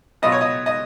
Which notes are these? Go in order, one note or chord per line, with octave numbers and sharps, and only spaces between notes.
B2 F#3 B3 F4 D#5
C#5
D#5
D#5